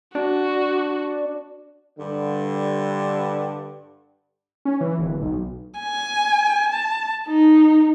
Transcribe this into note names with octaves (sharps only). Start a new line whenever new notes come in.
D4 F#4
G2 D3
C#4
E3
D1
B1
G#5
A5
D#4